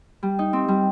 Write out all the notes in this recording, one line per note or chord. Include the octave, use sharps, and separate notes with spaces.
G3
D#4
C4
G3